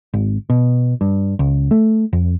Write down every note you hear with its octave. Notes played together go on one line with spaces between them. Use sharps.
G#1
B2
G2
C#2
A3
F2